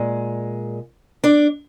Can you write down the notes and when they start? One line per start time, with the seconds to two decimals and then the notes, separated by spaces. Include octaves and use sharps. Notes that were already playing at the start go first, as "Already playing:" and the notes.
Already playing: A#2 G#3
1.24 D4 D5